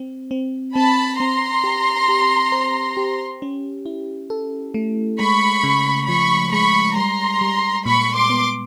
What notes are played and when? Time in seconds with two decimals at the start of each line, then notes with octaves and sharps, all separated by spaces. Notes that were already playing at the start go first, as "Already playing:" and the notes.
Already playing: C4
0.31 C4
0.75 C4 A5 B5
1.19 C4 A#5 C6
1.64 G4
2.08 G4
2.52 C5
2.97 G4
3.42 C#4
3.86 E4
4.30 A4
4.74 A3
5.19 G#3 B5 C#6
5.64 C#3
6.08 F3 B5 C#6
6.53 G#3 B5 C#6
6.97 G3 A#5 C6
7.41 G3
7.86 A#2 B5 C#6
8.15 C6 D6
8.30 B3